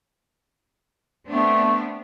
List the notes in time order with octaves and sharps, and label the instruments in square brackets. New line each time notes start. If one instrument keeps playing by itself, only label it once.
[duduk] A3 [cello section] B3 C4 D4